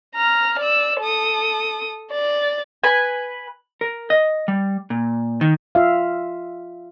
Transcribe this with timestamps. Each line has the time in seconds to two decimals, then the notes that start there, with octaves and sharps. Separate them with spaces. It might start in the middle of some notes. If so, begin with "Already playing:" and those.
0.15 A#5 F6
0.59 D5 E6
1.00 A4 D#6
2.11 D5 A6
2.84 B4 G#5
3.81 A#4
4.10 D#5
4.48 G3
4.90 A#2
5.41 D#3
5.75 F4 E5 F5